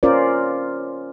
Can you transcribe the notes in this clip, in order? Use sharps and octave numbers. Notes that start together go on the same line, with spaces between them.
C#4 F4 A#4 C5 D5